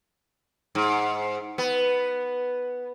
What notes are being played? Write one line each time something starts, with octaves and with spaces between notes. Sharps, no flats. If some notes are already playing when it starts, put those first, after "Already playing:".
G#2
B3